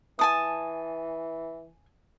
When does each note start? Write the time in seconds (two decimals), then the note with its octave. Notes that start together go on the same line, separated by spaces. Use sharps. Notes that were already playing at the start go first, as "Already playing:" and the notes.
0.19 E3 G#5 A5 D#6